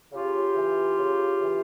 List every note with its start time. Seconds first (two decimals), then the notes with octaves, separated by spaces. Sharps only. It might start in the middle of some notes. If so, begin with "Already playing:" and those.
0.12 C#3 F4 G4
0.56 E3
0.98 C#3
1.41 E3